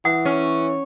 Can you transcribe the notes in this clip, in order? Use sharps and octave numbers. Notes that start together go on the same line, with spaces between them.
E3 F#5 D#6
C#4